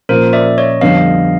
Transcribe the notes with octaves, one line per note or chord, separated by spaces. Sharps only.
A#2 F3 A#3 C#4 A#4 C5
D5 E5
C#5 D#5
F2 D3 G3 B3 D4 D#5 F5